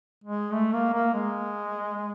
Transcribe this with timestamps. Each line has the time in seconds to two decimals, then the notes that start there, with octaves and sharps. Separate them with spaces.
0.24 G#3
0.53 A3
0.73 A#3
0.93 A#3
1.14 G#3